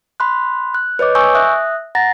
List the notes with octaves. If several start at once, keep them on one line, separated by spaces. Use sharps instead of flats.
B5 C6 F#6
F#6
B4 C#5 D#5 D6
G#5 C#6 D#6 E6 G6
E5 D#6 F#6
F#5 A#5 A6 A#6